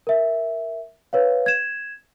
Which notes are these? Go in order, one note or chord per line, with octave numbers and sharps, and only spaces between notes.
A#4 E5
B4 C#5 F5
G#6 E7